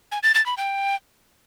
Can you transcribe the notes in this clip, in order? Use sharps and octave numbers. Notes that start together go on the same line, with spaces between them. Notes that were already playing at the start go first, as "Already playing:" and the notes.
G#5
A6
A6
B5
G5